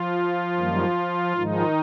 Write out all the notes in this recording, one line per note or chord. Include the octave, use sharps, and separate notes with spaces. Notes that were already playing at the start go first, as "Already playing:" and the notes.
Already playing: F3 F4
F#2 D#3 G3 A#3
G#2 D#3 F3 G#3 D#4